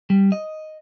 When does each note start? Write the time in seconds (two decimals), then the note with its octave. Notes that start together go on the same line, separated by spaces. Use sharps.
0.10 G3
0.32 D#5